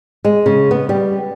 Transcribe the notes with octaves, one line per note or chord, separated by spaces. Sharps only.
G#3
C#3
B3
G3